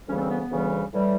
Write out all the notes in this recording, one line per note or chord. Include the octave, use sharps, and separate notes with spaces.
D2 C#3 E3 G3 C#4
B3
C4
B3
B3
D2 C#3 E3 G3
A2 E3 G3